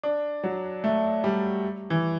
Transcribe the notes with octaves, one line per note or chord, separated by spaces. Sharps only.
D4
F#3
A3
G3
E3